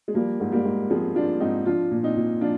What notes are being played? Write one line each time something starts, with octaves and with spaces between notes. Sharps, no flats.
G#3
F3 G3 A#3
G#2
G3 A#3
G#2
F3 G#3 C4
F3 D4 F4
G#2 C4 D#4
F3 D4 F4
A#2
C4 D#4
A#2
F3 D4 F4